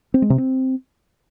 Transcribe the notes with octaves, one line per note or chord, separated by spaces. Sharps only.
C4
G#3
C3
C4